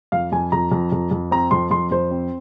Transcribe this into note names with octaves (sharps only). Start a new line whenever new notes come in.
F2 F5
F2 G#5
F2 A#5
F2
F2
F2
C4 A#5
F2 C6
F2 C6
F2 C5
C4